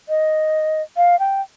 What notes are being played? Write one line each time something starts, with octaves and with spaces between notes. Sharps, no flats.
D#5
F5
G5